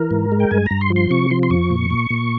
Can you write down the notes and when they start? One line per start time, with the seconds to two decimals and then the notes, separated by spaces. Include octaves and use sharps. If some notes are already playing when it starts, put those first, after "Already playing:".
Already playing: E3 A#4
0.11 G#2
0.32 G#3
0.40 G5
0.51 G2 G#5
0.66 G2 A#5
0.81 C6
0.90 F3
0.96 C6
1.11 C3 C#6
1.30 F3 C6
1.43 C6
1.50 F2 C#6
1.70 A#2
1.90 A#2
2.10 A#2